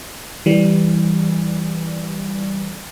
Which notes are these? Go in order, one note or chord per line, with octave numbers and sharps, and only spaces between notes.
E3 G3